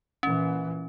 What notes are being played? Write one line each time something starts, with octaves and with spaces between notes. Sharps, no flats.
A#2 E3 C#4